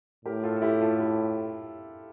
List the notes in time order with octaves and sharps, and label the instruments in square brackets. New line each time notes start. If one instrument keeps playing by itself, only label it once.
[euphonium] A2 [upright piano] G4 A#4
[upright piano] F4 A4
A4
E4 G4
F4 A4
E4 G4